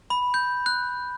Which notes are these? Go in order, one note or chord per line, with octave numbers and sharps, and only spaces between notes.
B5
G6
F#6